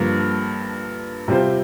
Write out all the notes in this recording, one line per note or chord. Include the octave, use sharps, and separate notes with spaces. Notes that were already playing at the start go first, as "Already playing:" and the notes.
Already playing: G2 D3 F3 A#3
C3 G3 C4 F4 C5